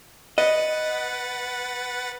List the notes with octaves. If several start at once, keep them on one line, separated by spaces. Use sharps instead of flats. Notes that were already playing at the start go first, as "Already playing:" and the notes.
B4 D#5 F#5 A6